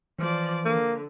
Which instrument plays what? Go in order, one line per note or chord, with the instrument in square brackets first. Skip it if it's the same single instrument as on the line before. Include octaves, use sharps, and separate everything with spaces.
[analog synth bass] E3 [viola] F3 D5
[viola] D3 [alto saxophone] A#3